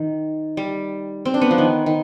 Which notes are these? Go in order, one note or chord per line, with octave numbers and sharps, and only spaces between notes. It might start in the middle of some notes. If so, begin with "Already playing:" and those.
Already playing: D#3
G3
C4
D4
B3
F3
D#3
D#3